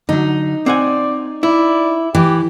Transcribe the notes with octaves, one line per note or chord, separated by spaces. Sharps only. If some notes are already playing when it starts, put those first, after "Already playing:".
D3 F#3 D#4
C4 D5 F#5 G#5
E4 D5
E3 G4